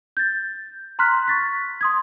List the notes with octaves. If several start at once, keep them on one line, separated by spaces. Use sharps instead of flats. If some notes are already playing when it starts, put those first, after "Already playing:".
G6 A6
A#5 C6 F6 F#6 B6
C#6 A6 B6
C6 D#6 G#6